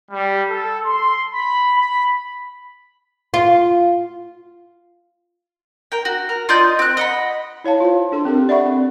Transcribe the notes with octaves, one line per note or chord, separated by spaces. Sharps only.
G3
A4
C6
B5
B5
F4
A#4 G5
F#4
A#4
F4 D5 D#5 G6
C4 F#6
D#5 F#5 B5
E4 C#5 F5 A5
F4 C5
D4 A4 C6
C4 D4 G4 A4 A#4
D5 E5 F#5 B5 C#6
C4